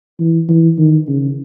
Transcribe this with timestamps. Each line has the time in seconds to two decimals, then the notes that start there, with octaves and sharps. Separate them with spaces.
0.19 E3
0.48 E3
0.78 D#3
1.08 C#3